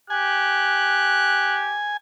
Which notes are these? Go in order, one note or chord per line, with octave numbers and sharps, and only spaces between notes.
G4 G#5 F#6